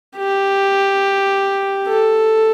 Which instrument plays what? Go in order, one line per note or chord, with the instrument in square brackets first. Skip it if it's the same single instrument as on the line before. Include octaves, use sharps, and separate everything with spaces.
[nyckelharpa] G4
A4